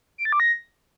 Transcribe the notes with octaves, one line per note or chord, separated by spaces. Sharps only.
D7
A6
D6
A#6